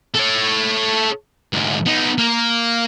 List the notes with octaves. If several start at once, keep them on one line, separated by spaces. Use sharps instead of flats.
A4 C#5
D2 G#2
B3 D#4
A#3